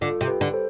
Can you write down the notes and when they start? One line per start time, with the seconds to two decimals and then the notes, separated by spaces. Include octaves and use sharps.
0.01 D3 F4 A4
0.21 C3
0.28 G4 B4
0.41 D3
0.53 A4 C5